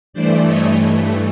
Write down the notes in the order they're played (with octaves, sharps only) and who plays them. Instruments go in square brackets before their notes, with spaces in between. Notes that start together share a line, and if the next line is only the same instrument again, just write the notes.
[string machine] G2 E3 A3 C5 D5
C#5 D#5